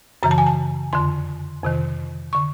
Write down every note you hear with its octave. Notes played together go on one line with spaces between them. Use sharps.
F#2 C#3 E3 A#5
A5
G#5
A5
F2 D3 C6
F2 C3 D#3
D3 C#6